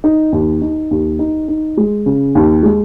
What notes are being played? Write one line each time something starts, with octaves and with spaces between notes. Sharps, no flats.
D#4
D#2
D#4
D#2
D#4
D#4
G#3
C#3
D#2
G#3